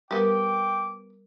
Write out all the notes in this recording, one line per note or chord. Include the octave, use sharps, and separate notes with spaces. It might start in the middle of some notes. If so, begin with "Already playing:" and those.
G3 B3 G4 A#4 G5 D6